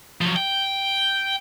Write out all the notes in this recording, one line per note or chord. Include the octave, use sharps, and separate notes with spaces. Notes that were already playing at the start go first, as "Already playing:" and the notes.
F3 F#3
G5